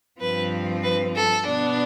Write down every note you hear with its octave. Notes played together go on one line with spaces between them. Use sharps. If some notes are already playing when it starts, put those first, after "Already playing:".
G2 F3 C4 B4
B4
A4
B2 B3 D4